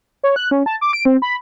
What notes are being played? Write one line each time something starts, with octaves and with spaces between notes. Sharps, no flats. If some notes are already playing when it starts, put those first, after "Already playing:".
C#5
F#6
C#4
A5
D6
D7
C4
B5